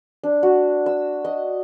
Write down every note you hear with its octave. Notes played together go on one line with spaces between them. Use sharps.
D4
F#4
E6
D#5